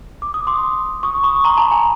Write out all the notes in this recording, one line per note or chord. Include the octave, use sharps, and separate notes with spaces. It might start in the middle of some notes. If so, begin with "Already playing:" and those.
D6
D#6
C6 D6
C#6 D#6
B5 C#6
A#5 C6
A5 B5
G#5 A#5